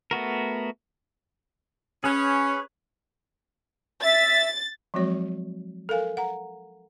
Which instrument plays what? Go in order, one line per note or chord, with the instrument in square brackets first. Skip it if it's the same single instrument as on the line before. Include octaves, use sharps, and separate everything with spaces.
[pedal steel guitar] A3 B3 F#4 A#4
[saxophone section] C#4 [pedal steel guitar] G#4 B4 C#5
[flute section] E5 [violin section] A6
[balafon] F3 F#3 G#3 C4 F#4 C#5
A4 A#4 F5 G#5
F#5 A#5